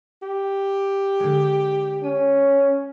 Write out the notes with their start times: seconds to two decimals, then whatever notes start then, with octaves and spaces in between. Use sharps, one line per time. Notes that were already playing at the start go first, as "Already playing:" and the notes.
0.22 G4
1.20 D3 G#3
2.04 C#4 D#7